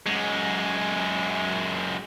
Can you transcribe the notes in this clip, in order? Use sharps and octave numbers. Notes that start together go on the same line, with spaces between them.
F#2 G#3